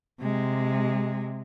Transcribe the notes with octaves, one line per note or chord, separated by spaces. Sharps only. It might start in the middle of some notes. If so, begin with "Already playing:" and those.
C3 G#3